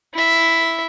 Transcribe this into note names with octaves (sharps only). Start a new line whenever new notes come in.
E4 E5